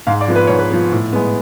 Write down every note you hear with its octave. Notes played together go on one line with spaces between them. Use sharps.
G#2 F5
D5
F3 B3
B4
G#2 C#5
B4
F3 B3
A2
G#3 B3